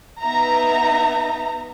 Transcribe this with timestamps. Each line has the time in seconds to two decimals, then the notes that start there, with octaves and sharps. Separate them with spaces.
0.22 B3 D#4 E5 A#5